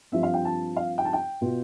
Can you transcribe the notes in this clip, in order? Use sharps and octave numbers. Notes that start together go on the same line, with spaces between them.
G2 F3 C4 E5
F5
G5
A5
F5
G5
A5
G5
B2 B3 F4